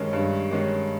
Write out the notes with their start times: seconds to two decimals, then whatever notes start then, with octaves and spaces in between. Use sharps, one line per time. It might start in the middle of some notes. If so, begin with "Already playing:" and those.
Already playing: G2 D#3 G#3 C#4
0.13 G2
0.51 D#3 G#3 C#4